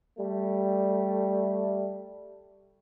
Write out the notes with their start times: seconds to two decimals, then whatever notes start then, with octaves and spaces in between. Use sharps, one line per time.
0.19 G3 A3